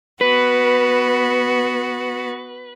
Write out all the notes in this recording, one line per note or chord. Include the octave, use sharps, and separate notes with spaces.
B3 F#4 B4